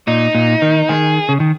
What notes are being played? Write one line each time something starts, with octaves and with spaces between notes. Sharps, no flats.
A#2 D#4
A#2
D#3
D#3 G#4
C#3
D#3